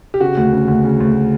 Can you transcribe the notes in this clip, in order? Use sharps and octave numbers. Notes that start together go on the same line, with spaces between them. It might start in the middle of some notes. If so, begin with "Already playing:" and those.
G4
C#3 F#4
D2
C#3
D2
C#3
D2